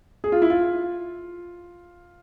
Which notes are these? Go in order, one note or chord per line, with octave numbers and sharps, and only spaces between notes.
G#4
F4
E4
F4